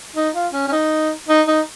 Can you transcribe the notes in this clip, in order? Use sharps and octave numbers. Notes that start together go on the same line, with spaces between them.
D#4
F4
C#4
C#4
D#4
D#4
D#4